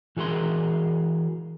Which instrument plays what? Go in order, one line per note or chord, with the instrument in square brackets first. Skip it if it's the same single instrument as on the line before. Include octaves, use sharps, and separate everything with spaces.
[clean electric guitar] E3 F#4 G#4 A#4 C6